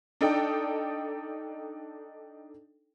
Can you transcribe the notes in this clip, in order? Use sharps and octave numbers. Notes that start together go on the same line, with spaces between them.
D4 D#4 A4 D5 G5